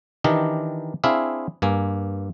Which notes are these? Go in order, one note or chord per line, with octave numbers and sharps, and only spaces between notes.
D#3 E3 D4 G4 A#4 D#5
C4 D4 E4 G#4 E5 F5
G2 A#3 G#5